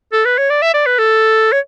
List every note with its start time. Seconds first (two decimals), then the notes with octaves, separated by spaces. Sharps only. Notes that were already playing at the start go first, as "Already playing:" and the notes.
0.12 A4
0.25 B4
0.38 C#5
0.50 D5
0.62 E5
0.74 D5
0.86 B4
0.98 A4
1.52 C#5